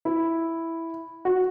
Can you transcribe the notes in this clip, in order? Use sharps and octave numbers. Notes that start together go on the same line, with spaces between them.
E4
F#4